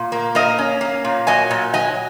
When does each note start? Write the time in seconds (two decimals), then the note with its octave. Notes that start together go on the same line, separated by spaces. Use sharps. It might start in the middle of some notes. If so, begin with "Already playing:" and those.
Already playing: A#2
0.12 A#3
0.35 A#3 A#4 D#5
0.58 C#4
0.81 A#3
1.05 A#2
1.27 F#3 D#5 G#5
1.51 A#2
1.74 F#3 D#5 G#5